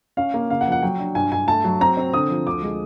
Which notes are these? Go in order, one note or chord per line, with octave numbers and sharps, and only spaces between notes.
C#4 F5
A#3
C#3 F5
F#5
F3
F#5
F#3 G5
D4
G2 G#5
G2 G#5
A3 A5
F#3
C4 A#5
C4
D3 D#6
F3
D2 D6
G#3